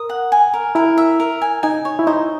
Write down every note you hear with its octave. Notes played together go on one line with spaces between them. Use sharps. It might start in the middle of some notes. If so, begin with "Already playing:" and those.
Already playing: A#4 D#6
F#5
G#5
A#4
E4 A#4
E5
A#4
G#5
D#4 G#5
C#5
E4
D#4 C5